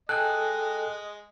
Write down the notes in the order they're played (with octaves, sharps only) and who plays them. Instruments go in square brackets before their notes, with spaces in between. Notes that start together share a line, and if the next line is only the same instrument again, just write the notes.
[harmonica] G#3 D#5 [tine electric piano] A4 G5 G#5 [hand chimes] F#6